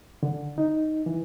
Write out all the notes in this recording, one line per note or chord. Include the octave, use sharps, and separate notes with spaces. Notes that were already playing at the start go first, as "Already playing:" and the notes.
D3
D#4
E3